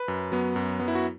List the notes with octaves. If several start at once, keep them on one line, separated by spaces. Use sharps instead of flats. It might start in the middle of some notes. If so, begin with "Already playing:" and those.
Already playing: B4
F#2
F#3 B3
F#2
F#3 B3
E4
F#4